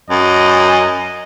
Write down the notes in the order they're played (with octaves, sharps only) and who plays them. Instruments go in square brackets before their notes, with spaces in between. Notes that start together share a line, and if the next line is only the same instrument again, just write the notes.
[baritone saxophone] F#2 [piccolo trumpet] D#5